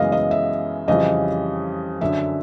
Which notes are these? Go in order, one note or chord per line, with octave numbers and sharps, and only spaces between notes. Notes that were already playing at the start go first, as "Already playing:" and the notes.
Already playing: F#2 C#3 E3 G#3 B3 D#5 F5
D#5
E5
F2 C#3 E3 G3 D#5
F#2 D3 F#3 E5